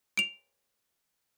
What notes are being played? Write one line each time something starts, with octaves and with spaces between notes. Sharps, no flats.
D7 F7